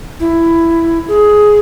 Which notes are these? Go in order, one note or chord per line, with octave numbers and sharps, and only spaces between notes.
E4
G#4